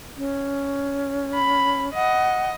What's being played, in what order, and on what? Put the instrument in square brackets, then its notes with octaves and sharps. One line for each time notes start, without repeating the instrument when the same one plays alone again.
[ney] C#4
[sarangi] B5
[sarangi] D#5 [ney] F#5